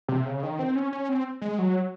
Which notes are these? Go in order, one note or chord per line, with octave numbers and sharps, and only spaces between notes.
C3
C#3
D#3
C4
C#4
C#4
C4
G#3
F#3